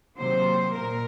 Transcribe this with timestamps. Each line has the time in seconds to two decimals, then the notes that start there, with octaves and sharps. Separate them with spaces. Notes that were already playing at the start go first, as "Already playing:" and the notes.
0.17 C3 D#3 F#3 A#3 C5
0.76 A#2 A#4